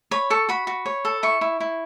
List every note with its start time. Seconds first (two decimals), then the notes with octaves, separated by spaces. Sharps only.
0.11 C#5 B5
0.30 A4 C#6
0.49 F#4 B5
0.67 F#4
0.86 C#5
1.05 A4
1.23 E4 C#6
1.41 E4
1.60 E4